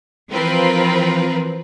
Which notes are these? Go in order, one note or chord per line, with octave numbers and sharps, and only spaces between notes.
E3 F3 C4 F4 A#4 B4